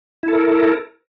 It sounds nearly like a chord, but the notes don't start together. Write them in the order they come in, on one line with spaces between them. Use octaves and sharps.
E4 A4 A#4